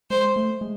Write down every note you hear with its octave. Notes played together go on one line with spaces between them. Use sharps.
G#3 C5
A3
G#3